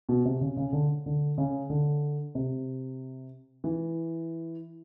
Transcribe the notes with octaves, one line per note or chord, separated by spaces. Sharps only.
B2
C3
C#3
C#3
D3
D3
C#3
D3
C3
E3